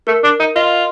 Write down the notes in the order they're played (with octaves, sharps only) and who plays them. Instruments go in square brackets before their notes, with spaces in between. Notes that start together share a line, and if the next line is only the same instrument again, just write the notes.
[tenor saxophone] A3 [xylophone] A#4
[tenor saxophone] D4
D#4
[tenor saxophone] F4 [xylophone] D#5